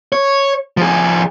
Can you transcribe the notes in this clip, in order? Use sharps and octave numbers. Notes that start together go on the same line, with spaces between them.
C#5
F3 G#4